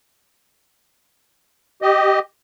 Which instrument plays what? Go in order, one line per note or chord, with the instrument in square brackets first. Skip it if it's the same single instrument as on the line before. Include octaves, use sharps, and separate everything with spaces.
[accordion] G4 D#5